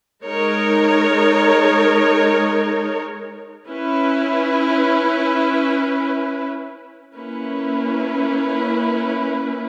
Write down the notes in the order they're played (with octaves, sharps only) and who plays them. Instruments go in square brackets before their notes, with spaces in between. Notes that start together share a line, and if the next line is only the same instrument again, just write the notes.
[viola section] G#3 D#4 A#4 C#5
C#4 E4 B4
A#3 C#4 E4 B4